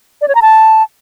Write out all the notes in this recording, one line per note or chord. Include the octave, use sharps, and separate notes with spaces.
D5
C#5
A#5
A5